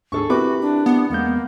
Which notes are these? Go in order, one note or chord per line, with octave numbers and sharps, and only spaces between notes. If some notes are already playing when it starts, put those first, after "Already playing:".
D2 G#2 D4 G#4 A4 C#6
C3 E4 F#4 G4 A#4 B4 D6
D4
B3
E2 G#3 A#3 G6